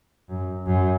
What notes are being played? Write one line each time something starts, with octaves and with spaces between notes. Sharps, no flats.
F#2
F#2